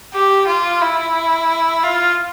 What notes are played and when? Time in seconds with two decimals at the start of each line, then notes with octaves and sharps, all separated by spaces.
0.14 G4
0.47 F4
0.82 E4
1.84 F4